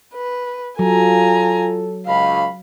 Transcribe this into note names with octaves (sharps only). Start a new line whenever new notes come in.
B4
F#3 F4 A4 G#5 A#5
C#2 F5 B5